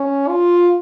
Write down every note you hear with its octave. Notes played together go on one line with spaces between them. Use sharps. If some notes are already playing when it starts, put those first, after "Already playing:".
Already playing: C#4
F4